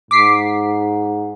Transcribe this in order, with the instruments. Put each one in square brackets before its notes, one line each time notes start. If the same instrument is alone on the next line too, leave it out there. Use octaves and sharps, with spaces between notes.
[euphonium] G#2 [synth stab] D6 B6 C7